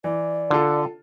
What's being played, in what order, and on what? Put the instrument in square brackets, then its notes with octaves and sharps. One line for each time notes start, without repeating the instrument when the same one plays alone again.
[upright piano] E3 [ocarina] D5
[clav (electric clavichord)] D3 [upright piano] D4 F4 A4